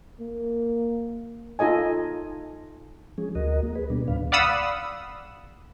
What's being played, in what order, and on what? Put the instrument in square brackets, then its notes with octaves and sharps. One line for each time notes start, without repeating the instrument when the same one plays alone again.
[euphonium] A#3
[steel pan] D#4 F4 A4 D#5 G#5
[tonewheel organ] F3 G#3 C#4 G#4
D2 F#4 A#4 D#5
A#3
G#4 B4
B2 G3 B3 D4
D2 A2 D#3 D4 B4 F5
[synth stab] D5 F5 F#5 B5 D#6 E6